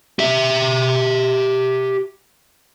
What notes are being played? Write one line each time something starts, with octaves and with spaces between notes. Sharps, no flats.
G4 E5